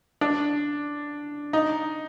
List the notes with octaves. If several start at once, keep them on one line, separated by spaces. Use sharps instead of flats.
D4
D#4